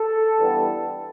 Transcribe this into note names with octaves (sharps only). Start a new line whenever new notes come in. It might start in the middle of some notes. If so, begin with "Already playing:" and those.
Already playing: A4
G2 E3 G3 B3